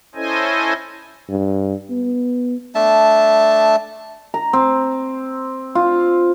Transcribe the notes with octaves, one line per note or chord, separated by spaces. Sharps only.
C#4 E4 A4 C5 D#5 G#5
G2
B3
A3 D4 E5 A5
A#5
C4
F4